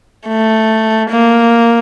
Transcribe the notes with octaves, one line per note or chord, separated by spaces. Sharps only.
A3
A#3